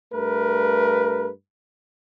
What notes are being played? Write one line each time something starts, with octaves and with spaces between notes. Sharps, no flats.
G2 A3 A#4 B4